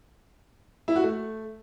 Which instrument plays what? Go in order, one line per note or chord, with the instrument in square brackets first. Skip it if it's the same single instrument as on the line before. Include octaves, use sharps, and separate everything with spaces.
[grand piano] E4
F#4
A3